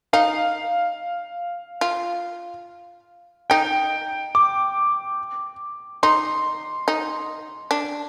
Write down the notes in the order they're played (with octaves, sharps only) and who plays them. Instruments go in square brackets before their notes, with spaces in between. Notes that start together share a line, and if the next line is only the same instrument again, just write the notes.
[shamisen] D#4 [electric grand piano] F5
[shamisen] F4
[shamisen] D#4 [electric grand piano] G5
[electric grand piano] D6
[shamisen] D#4 [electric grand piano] C6
[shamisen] D#4
D4